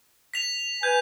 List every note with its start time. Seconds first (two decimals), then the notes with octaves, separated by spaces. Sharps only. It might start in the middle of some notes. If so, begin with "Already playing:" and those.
0.34 B6 F7
0.83 B4 G#5 G6